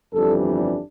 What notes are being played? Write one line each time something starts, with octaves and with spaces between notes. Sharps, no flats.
G1 F2 E3 G3 D4 A4